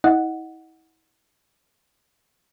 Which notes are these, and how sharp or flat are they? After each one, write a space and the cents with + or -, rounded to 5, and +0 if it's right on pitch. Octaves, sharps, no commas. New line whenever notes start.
E4 -40 D#5 +0 F#5 +0